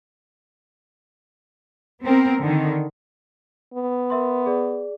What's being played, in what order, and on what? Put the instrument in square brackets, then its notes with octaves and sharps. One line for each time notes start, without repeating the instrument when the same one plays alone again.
[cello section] B3 C4 A#4
D3 D#3
[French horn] B3
[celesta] A#4 E5 C6
G#4 D5